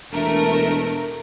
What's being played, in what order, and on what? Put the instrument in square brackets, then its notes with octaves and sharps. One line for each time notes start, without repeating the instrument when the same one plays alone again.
[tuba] E1 [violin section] A3 A#4 [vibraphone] D4 A#5